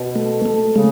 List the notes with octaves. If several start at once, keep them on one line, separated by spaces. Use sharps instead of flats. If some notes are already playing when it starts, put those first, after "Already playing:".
Already playing: B2
A3
A3
C#3 G#3